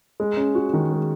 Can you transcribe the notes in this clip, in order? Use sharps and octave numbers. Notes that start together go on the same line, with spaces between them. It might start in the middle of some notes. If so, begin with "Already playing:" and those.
G#3
C#4
F#4
D#3
G#3